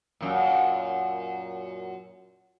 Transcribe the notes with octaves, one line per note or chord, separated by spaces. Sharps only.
F#2 A#2